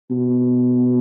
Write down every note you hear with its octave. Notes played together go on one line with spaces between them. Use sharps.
B2